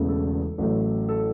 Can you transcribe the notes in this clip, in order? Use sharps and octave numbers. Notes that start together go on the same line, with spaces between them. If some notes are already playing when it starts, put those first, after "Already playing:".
Already playing: E1 E2 C#3 A3
A4
A1 A2 F#3 A3
A4